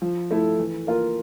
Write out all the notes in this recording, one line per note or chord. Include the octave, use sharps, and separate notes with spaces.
F3
A3 E4 A4
E3
A#3 F4 A#4